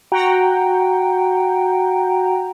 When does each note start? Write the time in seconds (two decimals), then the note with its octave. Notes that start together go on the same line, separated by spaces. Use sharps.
0.12 F#4 F#5 G5 A#5